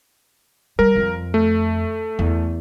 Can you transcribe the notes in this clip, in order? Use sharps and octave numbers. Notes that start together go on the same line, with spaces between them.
G3 A#4
F2
A3
E2